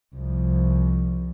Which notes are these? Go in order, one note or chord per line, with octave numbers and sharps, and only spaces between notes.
C2 F3